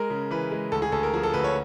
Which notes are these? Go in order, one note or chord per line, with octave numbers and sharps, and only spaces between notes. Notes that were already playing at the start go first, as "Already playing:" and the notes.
Already playing: G#3 A#4
C#3
E3 B4
G#3
D2 A4
G#4
D2 A4
A#4
F3 G#4
A4
D2 B4
C#5